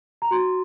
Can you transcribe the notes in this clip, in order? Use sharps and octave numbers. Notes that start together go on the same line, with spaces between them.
A#5
F#4 C6